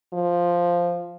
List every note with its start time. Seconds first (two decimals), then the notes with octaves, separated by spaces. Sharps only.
0.13 F3